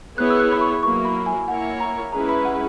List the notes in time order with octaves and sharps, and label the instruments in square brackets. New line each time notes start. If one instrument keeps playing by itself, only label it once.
[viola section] B3 E4 G#4 C#5 [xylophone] F#6
[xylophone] E6
F#6
B5
C#6
[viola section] F#3 A#3 E4 [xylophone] C#6
[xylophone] B5
G#5
[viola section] A#3 E4 A#4 C#5 [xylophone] F#5
[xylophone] A#5
[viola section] G#3 C#4 E4 G#4 B4 [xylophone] A#5
[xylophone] B5
F#5